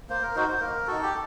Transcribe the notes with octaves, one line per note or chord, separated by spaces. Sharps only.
A#3 C5
A#4
D#4 F#4 C5
C5
A#3 A#4
D#4 F#4 A4
G4